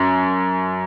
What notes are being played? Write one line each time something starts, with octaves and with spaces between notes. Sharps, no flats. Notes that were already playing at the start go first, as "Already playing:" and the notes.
Already playing: F#2